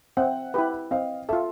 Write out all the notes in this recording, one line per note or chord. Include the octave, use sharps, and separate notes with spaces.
C4 E5 F#5
E4 G4 B4
C4 D#5 F5
F4 A4 E5